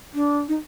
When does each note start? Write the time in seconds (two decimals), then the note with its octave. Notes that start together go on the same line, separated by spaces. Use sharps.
0.14 D4
0.48 D#4